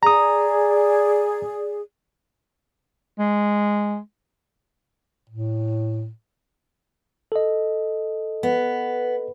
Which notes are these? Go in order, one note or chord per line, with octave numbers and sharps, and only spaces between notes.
G#4 D5 A#5 D#6
G#3
A2
A4 D#5
B3